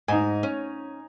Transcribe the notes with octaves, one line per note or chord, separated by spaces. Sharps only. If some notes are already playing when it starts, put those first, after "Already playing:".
G#2 D#4 G#5
C#4